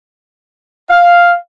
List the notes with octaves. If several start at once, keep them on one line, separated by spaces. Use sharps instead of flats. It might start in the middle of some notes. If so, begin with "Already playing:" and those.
F5